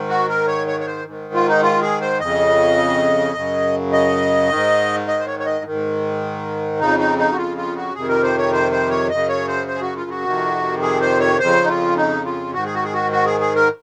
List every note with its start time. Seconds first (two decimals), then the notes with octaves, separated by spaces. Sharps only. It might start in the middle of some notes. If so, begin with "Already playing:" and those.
Already playing: G#2 D#3
0.09 F#4
0.29 A#4
0.47 C#5
0.67 C#5
0.80 C#5
0.86 C5
1.05 G#2 D#3
1.34 F4
1.48 D#4
1.63 F4
1.82 G#4
2.01 C5
2.20 F2 C#3 D#5
3.35 F#2 C#3
3.92 D#5
4.50 G#2 D#3
5.07 D#5
5.19 C5
5.26 C#5
5.39 C#5
5.46 D#5
5.65 G#2 D#3
6.80 F2 C#3 D#4
6.99 D#4
7.18 D#4
7.32 F#4
7.37 F4
7.57 F4
7.76 F#4
7.95 F2 C3 D#3 G#4
8.09 A#4
8.23 C5
8.38 C#5
8.53 C5
8.72 C5
8.90 C#5
9.10 F#2 C#3 D#5
9.29 C#5
9.48 C5
9.67 C5
9.75 G#4
9.81 F#4
9.96 F4
10.10 F#4
10.24 F2 C3 D#3
10.82 G#4
11.01 C5
11.20 C#5
11.40 F2 C#3 C5
11.64 D#4
11.68 F4
11.97 D#4
12.25 F4
12.54 G#2 D#3 F#4
12.65 G#4
12.74 F#4
12.84 G#4
12.94 F#4
13.12 F#4
13.26 G#4
13.40 G#4
13.55 A#4